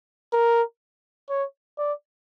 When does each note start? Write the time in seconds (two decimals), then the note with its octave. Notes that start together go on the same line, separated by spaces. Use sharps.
0.33 A#4
1.30 C#5
1.78 D5